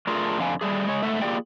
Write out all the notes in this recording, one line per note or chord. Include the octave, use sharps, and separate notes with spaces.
A3 D4 F4 G#4 A#4
F2 D3 F5 G#5
G3 A3 G#4
G#3 C#5
G#2 A3 A4 E5 F#5
A#3 F4 G4 G#4 D5 G5